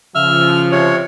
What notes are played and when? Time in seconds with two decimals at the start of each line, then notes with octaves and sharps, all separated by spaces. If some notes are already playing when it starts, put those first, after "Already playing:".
0.15 C#3 F3 E5 F6
0.72 C3 C#5